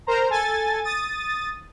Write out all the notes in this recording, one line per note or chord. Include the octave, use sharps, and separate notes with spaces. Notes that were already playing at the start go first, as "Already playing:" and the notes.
A#4 C5 A#5
A4 G#5 A6
D#6 A6 D#7